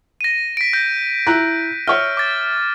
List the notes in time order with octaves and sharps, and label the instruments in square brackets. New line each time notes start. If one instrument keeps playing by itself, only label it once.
[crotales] A#6 D#7
B6 D7
G6 A#6
[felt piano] E4 A#5 F#6
[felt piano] C#5 E5 [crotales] F6
[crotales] D6 A6